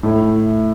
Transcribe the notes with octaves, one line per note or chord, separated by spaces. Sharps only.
A2 A3 E4